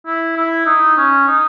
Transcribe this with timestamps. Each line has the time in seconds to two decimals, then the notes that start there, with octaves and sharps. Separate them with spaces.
0.07 E4
0.37 E4
0.66 D#4
0.98 C#4
1.27 D#4